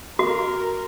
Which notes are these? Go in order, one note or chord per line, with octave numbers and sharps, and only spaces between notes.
F#4 A#4